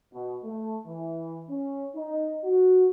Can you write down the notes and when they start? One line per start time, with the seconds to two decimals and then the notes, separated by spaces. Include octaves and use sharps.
0.13 B2
0.44 A3
0.87 E3
1.49 C#4
1.95 D#4
2.44 F#4